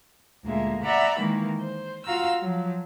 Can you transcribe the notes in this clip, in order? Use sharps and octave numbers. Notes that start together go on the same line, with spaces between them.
D2 A#2 G#3 A#3 E5
D5 E5 F#5 A#5 B5
D#3 E3 G#3 A#3
C5
F4 F#4 F5 A#5 E6
F3 F#3